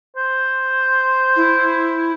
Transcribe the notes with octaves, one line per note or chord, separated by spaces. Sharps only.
C5
E4